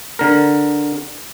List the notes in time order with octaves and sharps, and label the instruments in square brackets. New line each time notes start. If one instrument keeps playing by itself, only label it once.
[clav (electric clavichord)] D3 A#4